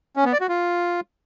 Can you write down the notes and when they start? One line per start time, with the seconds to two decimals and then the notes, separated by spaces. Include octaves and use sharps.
0.17 C#4
0.25 B3
0.33 D5
0.41 F#4
0.49 F4